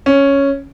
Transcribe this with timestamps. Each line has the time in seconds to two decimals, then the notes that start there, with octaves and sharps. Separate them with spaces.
0.06 C#4